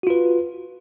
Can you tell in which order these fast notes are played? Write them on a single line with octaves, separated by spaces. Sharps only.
F#4 F4 B4